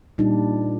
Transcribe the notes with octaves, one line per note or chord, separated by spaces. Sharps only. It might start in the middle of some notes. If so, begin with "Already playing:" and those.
A#2 G3 D4 D#4